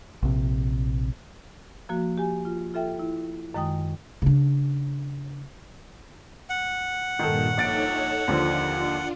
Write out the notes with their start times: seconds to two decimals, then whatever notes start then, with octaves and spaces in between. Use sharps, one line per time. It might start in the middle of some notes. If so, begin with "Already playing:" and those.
0.23 A#1 C3
1.89 F3 A#3 F#4
2.18 G4 G#5
2.45 F4
2.74 F4 A4 E5 G5
2.99 E4
3.54 F#2 D#3 G#3 G5 D#6
4.22 C#3 D4
6.50 F#5
7.19 G2 A#2 D#3 A4
7.57 A#1 D#4 A4 C#5 A6 D7
8.27 D#2 D3 F3 D4 F4